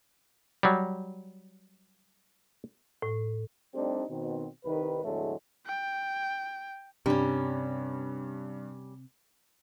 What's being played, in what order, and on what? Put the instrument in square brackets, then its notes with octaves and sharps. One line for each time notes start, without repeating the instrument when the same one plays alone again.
[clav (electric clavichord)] F#3 G3
[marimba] A2
[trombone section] G3 A3 C4 D4 D#4 G4
B2 D#3 C4
C2 D#3 B4
E2 A2 D3 F#3 G#3 A3
[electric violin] G5
[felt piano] G2 [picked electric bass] C3 [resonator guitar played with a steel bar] G3 C#4